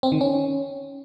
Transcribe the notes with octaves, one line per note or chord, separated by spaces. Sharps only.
C4
D#3
C#4